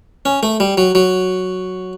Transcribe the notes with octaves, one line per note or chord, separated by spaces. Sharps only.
C#4
A3
G3
F#3
F#3